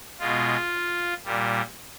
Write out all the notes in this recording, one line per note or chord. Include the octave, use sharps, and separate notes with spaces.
B2 G#3 F4
A#2 G3